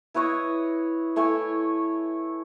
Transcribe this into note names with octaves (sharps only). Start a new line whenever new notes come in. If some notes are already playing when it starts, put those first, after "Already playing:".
E4 B4 C#5 D#5
A3 E4 C#5 G#5